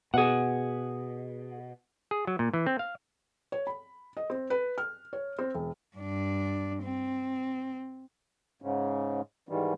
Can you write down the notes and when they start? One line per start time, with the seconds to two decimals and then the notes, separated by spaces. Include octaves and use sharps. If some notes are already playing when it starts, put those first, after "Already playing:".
0.14 B2 G#4 F#5
2.11 G#4
2.27 F#3
2.39 A#2
2.54 E3
2.67 C4
2.79 F5
3.52 C#5
3.67 B5
4.17 D#5
4.30 C4
4.50 B4
4.78 F6
5.13 C#5
5.39 C4
5.54 E1
5.97 G2 D4
6.83 C4
8.62 G#2 C#3
9.49 G#2 D#3 E3 G3